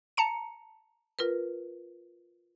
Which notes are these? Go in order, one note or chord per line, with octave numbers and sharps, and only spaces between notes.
A5 A#5 C#7
F4 A#4 B4